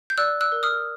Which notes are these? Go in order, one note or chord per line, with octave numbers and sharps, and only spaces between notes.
G6
D5 E6 F#6
E6 F#6
A#4
D#6 F6